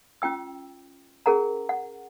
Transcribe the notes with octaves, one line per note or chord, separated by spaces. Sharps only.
C#4 F4 G5 E6
C#4 G#4 A#4 F#5 A#5
F#5